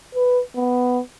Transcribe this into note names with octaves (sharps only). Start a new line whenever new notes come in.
B4
B3